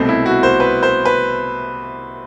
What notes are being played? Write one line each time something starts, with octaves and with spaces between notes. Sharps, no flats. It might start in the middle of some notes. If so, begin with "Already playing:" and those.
Already playing: C2 B2 A3 C4
E4
F#4
C5
B4
C5
B4